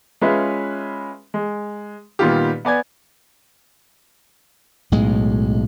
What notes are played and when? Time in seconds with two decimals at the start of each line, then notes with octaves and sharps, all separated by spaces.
0.21 G#3 C#4 F4 B4 E5
1.34 G#3
2.19 A#2 D#3 G3 B3 F4 G4
2.65 B3 D5 G#5 G#6
4.92 B1 A2 G#3